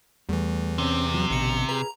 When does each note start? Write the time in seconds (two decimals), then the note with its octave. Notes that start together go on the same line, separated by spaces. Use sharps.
0.29 E2 E3 G3 A3
0.78 C3 C4 C#4
1.14 F3 F#3
1.30 A1 B2 D3 C#7
1.69 G#4 B4 A#5